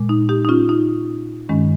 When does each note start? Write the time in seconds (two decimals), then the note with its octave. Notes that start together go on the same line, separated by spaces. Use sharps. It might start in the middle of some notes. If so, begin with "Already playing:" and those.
Already playing: A#2 G#3
0.09 D#4
0.29 D#4 G4
0.45 D#4
0.49 C#4 F4
0.69 D#4
1.49 G2 D#3 G#3 C#4